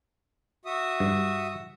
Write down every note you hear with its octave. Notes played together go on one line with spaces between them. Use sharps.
F#4 E5 D#6
G2